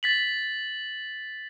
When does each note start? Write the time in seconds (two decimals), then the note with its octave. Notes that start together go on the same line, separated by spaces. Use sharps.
0.03 A6 B6 F#7